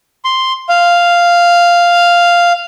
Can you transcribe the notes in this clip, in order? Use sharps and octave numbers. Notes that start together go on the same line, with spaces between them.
C6
F5